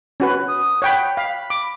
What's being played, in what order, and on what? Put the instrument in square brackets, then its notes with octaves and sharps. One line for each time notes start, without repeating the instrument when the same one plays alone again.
[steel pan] C#4 F#4 B4
[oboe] D#6
[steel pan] C#5 G5 B5 [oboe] F#5
[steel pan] F5 [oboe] B5
[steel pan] D6